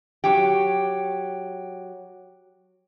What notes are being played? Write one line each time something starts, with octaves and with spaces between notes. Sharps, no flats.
F#3 G4